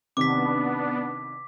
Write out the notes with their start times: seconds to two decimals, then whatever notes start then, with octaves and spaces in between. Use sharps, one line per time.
0.17 C3 D#3 B3 D4 D6 B6